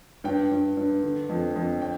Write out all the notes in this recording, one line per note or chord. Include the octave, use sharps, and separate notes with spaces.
G2 G5
G2
G2
D3
F2
F2
G5